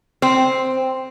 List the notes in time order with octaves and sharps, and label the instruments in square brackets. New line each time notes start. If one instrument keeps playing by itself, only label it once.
[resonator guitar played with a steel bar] C4